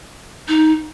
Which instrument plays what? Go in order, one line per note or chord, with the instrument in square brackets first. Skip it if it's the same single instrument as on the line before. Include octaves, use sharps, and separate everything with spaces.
[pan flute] D#4